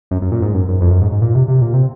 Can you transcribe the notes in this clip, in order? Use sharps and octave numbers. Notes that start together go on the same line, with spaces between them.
F#2
F#2
A#2
G#2
F#2
F#2
F2
F#2
G#2
G#2
A#2
C3
C3
A#2
C3